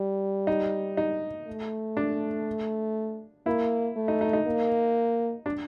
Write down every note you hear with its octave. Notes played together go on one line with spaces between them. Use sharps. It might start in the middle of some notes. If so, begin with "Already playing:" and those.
Already playing: G3
D#4
D#4
A3
D4
A#3 E4
A3
D#4
D#4
D#4
A#3
D4